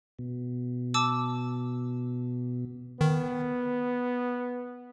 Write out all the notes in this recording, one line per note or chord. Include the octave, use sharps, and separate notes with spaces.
B2
A5 D6 E6
D#3 B3